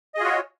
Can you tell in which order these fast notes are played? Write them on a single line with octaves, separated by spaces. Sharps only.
D#5 G#4 F4 F#4 C#5